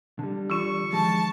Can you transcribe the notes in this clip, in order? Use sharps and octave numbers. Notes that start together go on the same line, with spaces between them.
D3 G3
E3 D4 F4 C#6
D#3 F3 G#3 A5